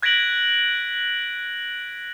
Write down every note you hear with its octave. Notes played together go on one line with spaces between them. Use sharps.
F#6 G#6 A#6 B6 D7 F#7